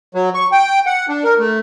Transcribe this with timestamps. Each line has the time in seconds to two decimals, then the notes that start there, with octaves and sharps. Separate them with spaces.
0.15 F#3
0.34 C#6
0.52 G5
0.86 F#5
1.09 D4
1.24 A#4
1.39 A3